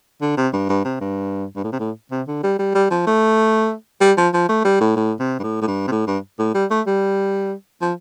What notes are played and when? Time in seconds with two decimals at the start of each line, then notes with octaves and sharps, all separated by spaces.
0.22 D3
0.37 C3
0.53 G2
0.69 G2
0.85 C3
1.01 G2
1.56 G2
1.64 A2
1.72 C3
1.80 A2
2.11 C3
2.28 D3
2.43 G3
2.59 G3
2.75 G3
2.91 F3
3.07 A3
4.01 G3
4.17 F3
4.34 F3
4.49 A3
4.65 G3
4.81 A2
4.96 A2
5.20 C3
5.39 G2
5.43 A2
5.62 A2
5.68 G2
5.88 C3
5.91 A2
6.07 G2
6.39 A2
6.54 G3
6.70 A3
6.87 G3
7.82 F3